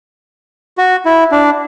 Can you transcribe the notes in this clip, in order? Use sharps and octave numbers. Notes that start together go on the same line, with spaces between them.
F#4
E4
D4